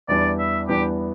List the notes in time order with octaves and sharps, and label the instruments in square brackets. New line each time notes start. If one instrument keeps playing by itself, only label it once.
[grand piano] E2 E3 G3 B3 D4 [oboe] D5
[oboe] E5
[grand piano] E2 E3 G3 B3 D4 [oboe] G4